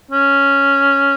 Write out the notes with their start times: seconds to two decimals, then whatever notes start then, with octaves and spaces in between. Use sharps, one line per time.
0.11 C#4